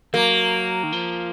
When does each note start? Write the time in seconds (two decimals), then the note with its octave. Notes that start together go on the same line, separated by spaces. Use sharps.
0.14 F#3 A#3
0.83 D#3
0.92 F3